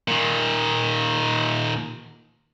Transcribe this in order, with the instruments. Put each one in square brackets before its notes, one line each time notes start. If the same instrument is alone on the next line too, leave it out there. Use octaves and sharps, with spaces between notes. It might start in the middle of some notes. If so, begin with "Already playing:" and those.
[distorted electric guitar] A#2 D#3